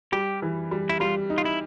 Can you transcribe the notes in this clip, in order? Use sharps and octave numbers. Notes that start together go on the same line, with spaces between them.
G3 G4
E3
G3
E4
G3 F4
D#4
F4
E4